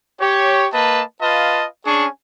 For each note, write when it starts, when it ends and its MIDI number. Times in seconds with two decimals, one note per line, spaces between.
0.21 0.67 67
0.21 0.67 73
0.73 1.02 58
0.73 1.02 71
0.73 1.02 75
0.73 1.02 81
1.22 1.66 65
1.22 1.66 71
1.22 1.66 75
1.22 1.66 77
1.22 1.66 81
1.86 2.07 61
1.86 2.07 62
1.86 2.07 68
1.86 2.07 80
1.86 2.07 85